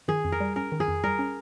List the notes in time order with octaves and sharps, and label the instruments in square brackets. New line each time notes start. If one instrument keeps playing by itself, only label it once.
[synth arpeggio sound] D#3 [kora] G#4
[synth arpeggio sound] F2
[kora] A#4
[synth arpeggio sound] G3
[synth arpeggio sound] C#4 [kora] A#4
[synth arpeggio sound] D#3
[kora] G#4
[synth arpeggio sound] F2
[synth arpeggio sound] G3 [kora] A#4
[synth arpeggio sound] C#4